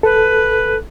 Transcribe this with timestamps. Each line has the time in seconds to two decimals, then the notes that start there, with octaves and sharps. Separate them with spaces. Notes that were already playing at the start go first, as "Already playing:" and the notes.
0.03 A4 B4